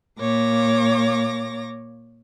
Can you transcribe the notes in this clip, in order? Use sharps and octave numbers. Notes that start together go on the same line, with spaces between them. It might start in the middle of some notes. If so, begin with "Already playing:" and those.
A#2 A#3 C#5 D6 A#6